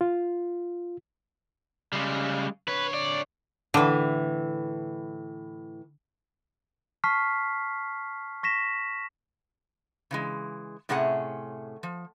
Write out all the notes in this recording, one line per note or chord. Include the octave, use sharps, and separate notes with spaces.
F4
C#3 G3 G#3
D3 B4 C#5
D5
A2 D3 E3
A5 C#6 F6 B6 C7
C#6 A#6 B6 E7
C#3 E3 G#3
A2 C3 A3 C#4 G#4 F#5
F3